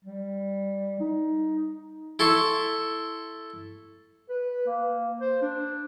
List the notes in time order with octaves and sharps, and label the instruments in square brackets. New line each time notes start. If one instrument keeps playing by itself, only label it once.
[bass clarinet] G3
D#4
[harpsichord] E4 A4 C6 C#6
[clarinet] B4
A#3
C5
D4